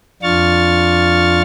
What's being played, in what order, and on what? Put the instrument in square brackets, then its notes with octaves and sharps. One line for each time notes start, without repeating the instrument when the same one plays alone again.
[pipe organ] F2 D4 F4 C#6 F6 A6